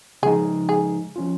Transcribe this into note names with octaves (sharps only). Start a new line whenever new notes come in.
C#3 F3 G#3 D#4 G#4
G#4
F3 C#4 F4